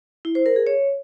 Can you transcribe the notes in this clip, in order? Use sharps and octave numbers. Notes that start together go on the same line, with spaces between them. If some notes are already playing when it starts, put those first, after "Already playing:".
E4
C5
A#4
G#4
C#5